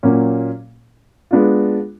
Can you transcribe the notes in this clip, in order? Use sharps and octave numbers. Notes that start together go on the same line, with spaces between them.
A#2 F#3 A#3 C#4
G#3 B3 D4 F4